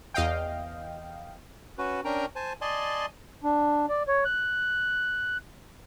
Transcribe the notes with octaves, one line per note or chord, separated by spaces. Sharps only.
E2 D#5 F5 G5
C#4 F#4 B4
C#4 D4 A#4 G5 A#5
C5 G#5 A5
D5 D#5 G#5 A5 C6
D4
D5
C#5
F#6